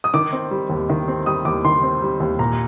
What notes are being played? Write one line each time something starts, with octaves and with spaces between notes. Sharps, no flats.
D#6
D#3 D6
C4
G3
D#2
D#3
C4
G3 D#6
D#2 D6
D#3 C6
C4
G3
D#2
A#2 A#5